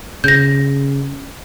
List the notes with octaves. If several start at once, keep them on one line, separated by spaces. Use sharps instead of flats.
C#3 G6 A#6